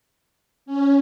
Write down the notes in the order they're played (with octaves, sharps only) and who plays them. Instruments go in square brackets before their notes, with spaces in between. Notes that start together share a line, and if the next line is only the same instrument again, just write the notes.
[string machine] C#4